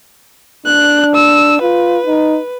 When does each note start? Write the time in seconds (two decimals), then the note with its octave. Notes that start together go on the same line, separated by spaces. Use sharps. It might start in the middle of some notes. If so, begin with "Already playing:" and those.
0.66 D4 F#6
1.15 E6
1.62 F4 B4
2.06 D#4